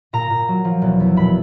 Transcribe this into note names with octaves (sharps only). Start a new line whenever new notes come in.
A#2 A#5
A#2
F#3
F3
E1
E2
A#2 B5